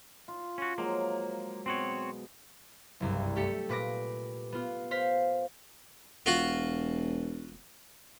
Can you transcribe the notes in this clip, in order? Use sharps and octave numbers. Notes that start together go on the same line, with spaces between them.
F4
C#4 F#4
F3 F#3 G#3 A#3
B2 B3 C4 F#4 C#5
F#1 C2 G2
A3 G4 A4 C#7
A#2 B4 D6 A#6
B3 F4
C5 F5 B6
E1 F4 F#4 F#5